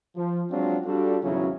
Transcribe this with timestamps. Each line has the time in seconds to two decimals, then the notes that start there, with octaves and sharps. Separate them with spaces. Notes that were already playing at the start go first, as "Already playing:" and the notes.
0.16 F3
0.51 F#3 G#3 C4 D4 F4 F#4
0.86 G3 D4 F4 F#4 A4
1.23 G#1 E2 C#3 F#3 C#4 E4